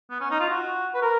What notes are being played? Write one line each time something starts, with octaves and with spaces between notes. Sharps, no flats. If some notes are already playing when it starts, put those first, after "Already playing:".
B3
C#4
D#4
F4
F#4
B4
A#4